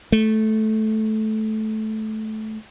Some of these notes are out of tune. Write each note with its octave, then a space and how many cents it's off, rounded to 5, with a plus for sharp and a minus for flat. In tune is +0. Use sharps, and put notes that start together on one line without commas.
A3 -15